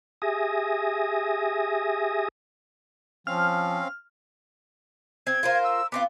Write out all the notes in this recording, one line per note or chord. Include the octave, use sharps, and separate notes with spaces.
G4 G#4 E5 G#5 D#6 A#6
F3 C4 C#4 F5 F6
C4 G#6
F4 A#4 C5
E6
B3 C4 F4 D6